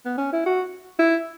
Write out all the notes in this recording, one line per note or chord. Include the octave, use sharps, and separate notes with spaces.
B3
C#4
E4
F#4
E4